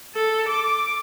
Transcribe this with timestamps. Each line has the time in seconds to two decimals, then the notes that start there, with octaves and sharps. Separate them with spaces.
0.15 A4
0.48 D6